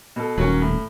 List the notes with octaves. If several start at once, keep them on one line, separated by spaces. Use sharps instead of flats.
B2 A4
D#1 F#3 A#3 C#4
A2